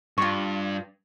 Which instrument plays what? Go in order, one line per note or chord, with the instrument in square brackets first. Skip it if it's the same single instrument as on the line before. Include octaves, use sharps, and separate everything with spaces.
[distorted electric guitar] G2 [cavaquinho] F4 C#6